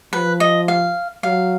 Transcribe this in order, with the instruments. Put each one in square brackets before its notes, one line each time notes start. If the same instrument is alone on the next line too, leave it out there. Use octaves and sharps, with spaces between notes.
[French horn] F3 [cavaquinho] B4
[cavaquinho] D#5
F5
[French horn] F#3 [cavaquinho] F5